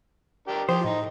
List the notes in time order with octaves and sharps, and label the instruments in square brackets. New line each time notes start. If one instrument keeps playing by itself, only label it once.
[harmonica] D4 G4 A#4
[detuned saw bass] F3 [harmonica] G4 D#6 [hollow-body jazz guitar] C5
[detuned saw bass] A2 [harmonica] D#4